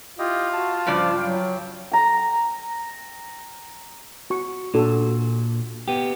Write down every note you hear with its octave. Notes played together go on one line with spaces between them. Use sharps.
E4 F4 G4 D#5
F#4 A5
G2 C#3 F3 D5
F#3 G5
G5 A#5
F#4 C#6
A#2 D4 F#4 A4
B3 G4